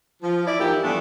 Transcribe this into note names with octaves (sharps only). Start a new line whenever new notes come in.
F3
E4 D5
G#2 E3 F3 A#3 E4 G4
E3 F3 G3 A3 B3 D4